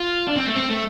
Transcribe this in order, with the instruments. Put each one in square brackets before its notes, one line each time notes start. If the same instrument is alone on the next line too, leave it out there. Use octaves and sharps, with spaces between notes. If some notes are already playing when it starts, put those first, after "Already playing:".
Already playing: [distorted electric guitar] F4
D4
C4
A3
C4
A3